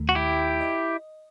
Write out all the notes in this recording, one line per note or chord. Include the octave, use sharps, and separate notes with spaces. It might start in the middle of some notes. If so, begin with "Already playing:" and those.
Already playing: D#2 D#3 A3
F#4
E4 G4
D#5